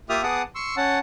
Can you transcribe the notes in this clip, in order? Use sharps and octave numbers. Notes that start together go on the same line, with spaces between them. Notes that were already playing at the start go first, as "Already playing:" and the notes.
A#3 F4 G4 E5 D#6 F6
B3 G#4 F#5 A5 D6 D#6
C6 C#6 E6
C#4 F#5 A5